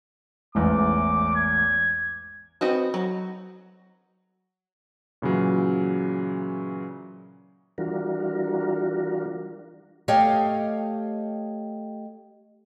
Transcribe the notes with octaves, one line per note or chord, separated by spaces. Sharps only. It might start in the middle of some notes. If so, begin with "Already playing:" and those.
A1 E2 G#2 D6
G#6
B3 C4 D#4 F#4
F#3
A#2 C#3 E3 F#3
E3 G3 D4 F4 F#4 A#4
A3 G4 C#5 D#5 F5